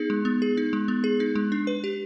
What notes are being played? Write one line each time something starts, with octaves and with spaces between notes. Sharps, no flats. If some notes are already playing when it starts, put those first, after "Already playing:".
Already playing: B3 D#4 G#4
G#3
B3
G#4
D#4
G#3
B3
G#4
D#4
G#3
D4
B4
G4